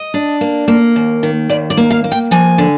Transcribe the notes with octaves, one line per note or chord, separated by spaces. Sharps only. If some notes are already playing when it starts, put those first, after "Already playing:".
Already playing: D#5
D4
A#3
A#3
D#2
D#3
D#2 D5
D5
A#3
F5
A#3
G5
F3 G#5
D3